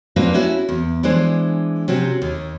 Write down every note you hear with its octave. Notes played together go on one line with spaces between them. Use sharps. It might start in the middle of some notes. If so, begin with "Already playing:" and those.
A#3 C4 D4 F4 F#4 B4
C#4 E4 F#4
E2
E3 G#3 D4 C5
C3 C4 C#4 F#4
D#2